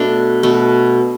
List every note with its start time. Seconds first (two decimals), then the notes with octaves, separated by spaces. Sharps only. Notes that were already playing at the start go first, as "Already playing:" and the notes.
Already playing: B2 A3 D4
0.43 B2 A3